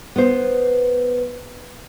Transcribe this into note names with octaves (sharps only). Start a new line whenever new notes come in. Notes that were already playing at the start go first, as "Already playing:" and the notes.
B3 C5